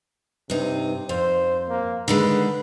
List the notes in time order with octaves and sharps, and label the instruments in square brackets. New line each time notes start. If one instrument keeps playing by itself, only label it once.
[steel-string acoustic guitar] G2 D#4 [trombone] C3
[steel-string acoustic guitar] F2 [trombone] C5
[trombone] A#3
[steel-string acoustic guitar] D3 D#3 G#3 [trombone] B4